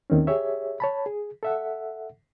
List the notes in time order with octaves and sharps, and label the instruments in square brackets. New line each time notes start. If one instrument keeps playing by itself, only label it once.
[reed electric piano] D#2 D#3 C4 C#4
G4 G#4 C#5 E5
C#5 A5 B5
G#4
A4 E5 F#5